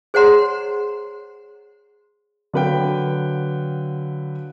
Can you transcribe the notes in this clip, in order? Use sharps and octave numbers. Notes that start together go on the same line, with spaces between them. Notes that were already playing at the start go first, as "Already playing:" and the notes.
G#4 C5 C#5 F#5 A#5 C6
D3 F#3 B4 F5 G5